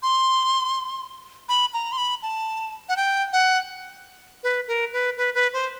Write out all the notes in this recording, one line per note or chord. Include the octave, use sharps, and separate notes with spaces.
C6
B5
A#5
C6
B5
A5
F#5
G5
F#5
B4
A#4
B4
B4
B4
C5